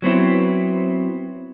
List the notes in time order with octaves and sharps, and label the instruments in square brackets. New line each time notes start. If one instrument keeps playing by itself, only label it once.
[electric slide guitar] F#3 B3 C4 E4